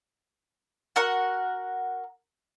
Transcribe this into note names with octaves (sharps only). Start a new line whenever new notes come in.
F#4 A#4 F#5